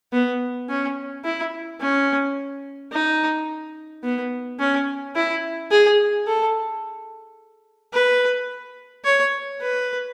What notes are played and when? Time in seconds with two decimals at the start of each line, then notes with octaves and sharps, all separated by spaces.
0.13 B3
0.69 C#4
1.25 E4
1.81 C#4
2.92 D#4
4.04 B3
4.60 C#4
5.16 E4
5.71 G#4
6.27 A4
7.94 B4
9.05 C#5
9.61 B4